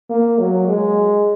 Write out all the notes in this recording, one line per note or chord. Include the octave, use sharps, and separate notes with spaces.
A#3
F#3
G#3